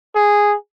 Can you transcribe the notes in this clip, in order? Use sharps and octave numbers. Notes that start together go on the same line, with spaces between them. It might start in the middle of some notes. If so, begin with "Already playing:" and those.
G#4